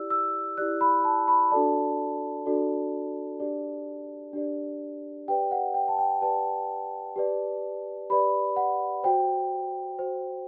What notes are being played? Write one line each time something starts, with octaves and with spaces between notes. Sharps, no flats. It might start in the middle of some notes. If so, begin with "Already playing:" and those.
Already playing: E4 G4 D5 E6
E6
E4 G4 D5 F#6
B5
A5
B5
D4 F#4 A4 D5 A5
D4 F#4 A4 D5
D4 G4 D5
D4 G4 D5
G4 B4 D5 G5
F#5
G5
A5
G5
G4 B4 D5 A5
G4 B4 D5
G4 B4 D5 B5
F#5
F#4 C5 G5
F#4 C5